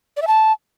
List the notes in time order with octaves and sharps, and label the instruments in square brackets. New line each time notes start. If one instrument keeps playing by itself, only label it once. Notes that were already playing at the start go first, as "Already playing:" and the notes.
[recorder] D5
E5
A5